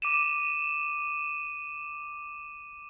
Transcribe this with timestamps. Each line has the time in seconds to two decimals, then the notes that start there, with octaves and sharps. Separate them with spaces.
0.02 D6 D#7 E7